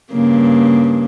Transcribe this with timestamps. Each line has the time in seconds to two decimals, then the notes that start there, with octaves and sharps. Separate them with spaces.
0.11 G2 C#3 A#3